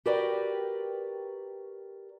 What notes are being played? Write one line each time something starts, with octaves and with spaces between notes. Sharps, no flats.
F#4 G4 A#4 B4 D5 G5